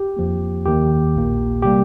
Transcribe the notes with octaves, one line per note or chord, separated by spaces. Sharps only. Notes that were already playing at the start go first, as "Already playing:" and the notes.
Already playing: G4
F2 F3 A#3
D#2 D#3 A#3 G4
A#1 A#2 A#3
C3 G3 A#3 G4